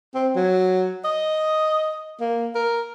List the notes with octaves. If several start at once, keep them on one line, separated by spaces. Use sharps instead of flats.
C4
F#3
D#5
A#3
A#4